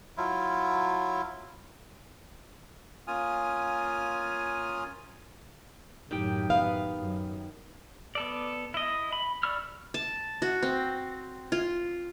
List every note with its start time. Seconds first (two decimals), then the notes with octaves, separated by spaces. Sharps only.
0.17 F#3 E4 F4
3.07 A#3 C#4 F4 G#5 D#6 F6
6.11 F#2 A2 D#3 G4 G5
6.50 B3 F5
6.99 F#2
8.15 B3 A4 D5
8.74 E4 D#5
9.13 B5
9.43 D5 B5 C#6 E6 F6
9.94 A5
10.42 F#4
10.62 C4
11.52 F4